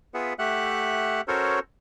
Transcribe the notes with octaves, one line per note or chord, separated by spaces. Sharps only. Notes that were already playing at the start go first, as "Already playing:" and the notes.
B3 F4 G#4 B4 E5 F#5
A3 G4 E5 F#5 F#6
C#4 F#4 A4 A#4 C5 C#5